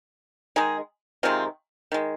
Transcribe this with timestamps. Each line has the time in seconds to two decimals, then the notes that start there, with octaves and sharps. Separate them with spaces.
0.56 D#3 G#3 D#4 G#4
1.23 C3 D#3 G#3 C4 F4
1.92 D#3 G#3